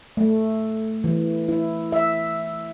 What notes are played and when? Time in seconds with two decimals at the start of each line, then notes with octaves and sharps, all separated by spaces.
0.17 A3
1.04 E3
1.48 E4
1.92 E5